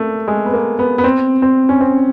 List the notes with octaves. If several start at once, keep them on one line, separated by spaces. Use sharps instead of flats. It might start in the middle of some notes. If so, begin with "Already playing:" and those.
Already playing: A3 A#3
G#3
B3
A#3
B3
B3
C4
C4
C#4
C4